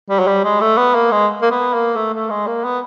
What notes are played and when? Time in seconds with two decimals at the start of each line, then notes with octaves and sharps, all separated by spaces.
0.10 G3
0.19 F#3
0.27 G3
0.44 G#3
0.60 A3
0.77 B3
0.95 A#3
1.11 G#3
1.42 A#3
1.51 B3
1.74 A#3
1.96 A3
2.13 A3
2.30 G#3
2.47 A#3
2.64 B3